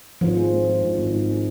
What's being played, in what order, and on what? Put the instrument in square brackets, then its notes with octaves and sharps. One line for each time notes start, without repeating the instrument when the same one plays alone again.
[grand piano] G#1 [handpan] F3
[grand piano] G#3
G#3
G#3
G#1
G#1
G#2
G#3